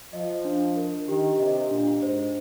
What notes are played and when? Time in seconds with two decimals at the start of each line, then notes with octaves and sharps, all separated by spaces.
0.13 F3 D#5
0.45 D4
0.76 A#4
1.08 D#3 G4
1.39 C3 D#5
1.71 A#2 D4
2.03 G#2 C5